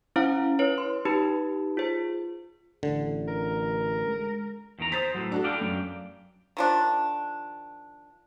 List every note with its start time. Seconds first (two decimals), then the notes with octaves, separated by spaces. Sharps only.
0.16 C#4 E4 C5 F5 F#5 A#5
0.59 E4 B4 C#5
0.78 C6
1.05 D#4 G4 B4 A5 B5
1.77 F4 G#4 C5
2.83 A1 D3
3.28 A#4
4.07 G#3
4.79 E2 D#3 A#5
4.92 C5 D#6 A6 B6
5.15 A2 F#3
5.32 D4 F#4 A4
5.44 D5 F5 G5
5.61 F#2
6.57 D#3 F3 D4